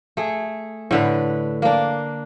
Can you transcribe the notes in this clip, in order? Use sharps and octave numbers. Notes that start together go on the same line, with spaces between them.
A3 G#4
A2 D3 B4
A#3 D4